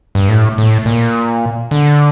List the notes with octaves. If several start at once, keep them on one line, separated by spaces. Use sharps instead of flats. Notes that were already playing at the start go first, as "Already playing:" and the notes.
G2
A2
A2
A#2
D3